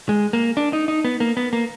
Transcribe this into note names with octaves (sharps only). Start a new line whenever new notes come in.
G#3
A#3
D4
D#4
D#4
B3
A#3
B3
A#3